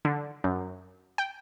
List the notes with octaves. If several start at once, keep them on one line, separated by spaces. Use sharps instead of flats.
D3
F#2
G5